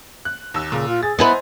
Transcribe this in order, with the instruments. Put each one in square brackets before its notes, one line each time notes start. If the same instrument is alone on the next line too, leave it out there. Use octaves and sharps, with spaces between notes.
[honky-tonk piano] F#6
D#2 E6
[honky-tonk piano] A#2 [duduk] C#3
[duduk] F4
[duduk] G#4 [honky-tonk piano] A6
[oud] B3 E4 B4 [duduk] C5 [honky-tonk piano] D#5 G#5 A#5